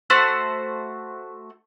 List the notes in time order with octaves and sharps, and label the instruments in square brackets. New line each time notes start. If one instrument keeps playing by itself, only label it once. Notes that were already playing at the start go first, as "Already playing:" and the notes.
[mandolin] A3 F#4 C5